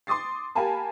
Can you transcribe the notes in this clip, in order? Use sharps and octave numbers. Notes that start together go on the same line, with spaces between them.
C6 D6 D#6 A6 C7
G4 A#4 F5 G#5 A5 B5